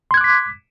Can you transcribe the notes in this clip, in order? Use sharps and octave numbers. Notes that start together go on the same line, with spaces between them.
C6 D6 F#6 G#6 B6